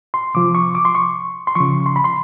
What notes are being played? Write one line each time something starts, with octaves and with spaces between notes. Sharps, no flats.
C6
C3 F3 D6
C#6
D6
C6
C#6
C6
C#3 F3 C#6
C6
B5
C6